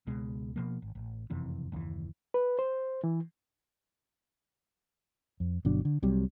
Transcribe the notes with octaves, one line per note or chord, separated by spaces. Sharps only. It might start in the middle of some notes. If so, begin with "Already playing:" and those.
C#2 B2 G#3
B2 F3 A#3
G#1
A1
F#1 F2 C3 E3
F#1 D#2 A2 E3
B4
C5
E3
F2
G1 B2 F#3 D4
D3
C2 C3 F#3 G3